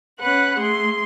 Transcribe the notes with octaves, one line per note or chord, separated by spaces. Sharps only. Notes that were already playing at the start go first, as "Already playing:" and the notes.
C#4 B4 F#5 F#6
A3 G#4 C6